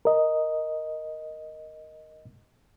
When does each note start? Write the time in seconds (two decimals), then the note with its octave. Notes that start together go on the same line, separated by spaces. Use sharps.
0.05 A#4 D#5